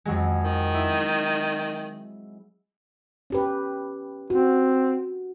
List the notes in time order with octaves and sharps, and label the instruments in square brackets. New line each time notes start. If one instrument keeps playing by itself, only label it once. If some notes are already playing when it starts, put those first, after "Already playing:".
[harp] F2 F#3 G#3
[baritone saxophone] D#3
[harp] E4
[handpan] C#4 G4 B4
[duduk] C4 [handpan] F#4